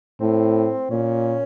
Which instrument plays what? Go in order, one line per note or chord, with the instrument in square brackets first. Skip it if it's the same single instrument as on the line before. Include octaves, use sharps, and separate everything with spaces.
[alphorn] A2 [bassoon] C4
[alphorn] A#2 [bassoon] C#4